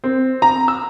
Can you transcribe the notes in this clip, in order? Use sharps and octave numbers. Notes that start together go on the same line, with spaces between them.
C4
A#5
E6